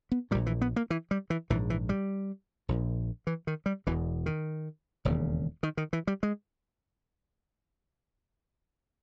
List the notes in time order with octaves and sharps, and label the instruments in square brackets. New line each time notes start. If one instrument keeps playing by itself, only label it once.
[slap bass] B3
A#2 G3
A#1
E3
B3
A#3
E3
G3
E3
A#1 G#2 E3
E3
G3
A#1 A#2
E3
D#3
G3
E1 E2 B2 E3
D#3
E1 D#2 C#3
D#3
D#3
E3
G3
G#3